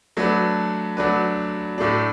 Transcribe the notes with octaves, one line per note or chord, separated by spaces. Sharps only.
F#3 A3 D4 B4
F#3 A3 D4 B4
A2 A3 D4